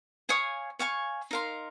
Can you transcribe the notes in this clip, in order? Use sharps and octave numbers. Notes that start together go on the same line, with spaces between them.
C#5 F5 G#5 D#6
C#5 F5 G#5 C#6
D#4 A#4 F5 C6